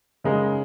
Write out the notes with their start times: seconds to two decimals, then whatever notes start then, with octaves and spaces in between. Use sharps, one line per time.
0.24 C#3 G#3 D#4 A#4